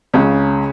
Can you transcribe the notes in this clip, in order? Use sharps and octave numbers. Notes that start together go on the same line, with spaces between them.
C#2 C#3